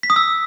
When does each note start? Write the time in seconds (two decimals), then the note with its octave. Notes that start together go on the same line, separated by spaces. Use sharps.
0.03 B6
0.10 D#6
0.16 E6